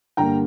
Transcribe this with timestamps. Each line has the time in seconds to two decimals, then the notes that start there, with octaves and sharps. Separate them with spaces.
0.17 G2 D3 G3 A#3 G5 A#5